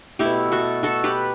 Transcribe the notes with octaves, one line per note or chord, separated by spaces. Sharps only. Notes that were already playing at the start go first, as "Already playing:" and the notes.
B2 A3 E4 G4
F#4 A4
F#4 A4
G4 B4